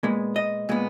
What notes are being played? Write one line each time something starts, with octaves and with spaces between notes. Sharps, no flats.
A#2 G#3 B3
D#5
A#2 G#3 B3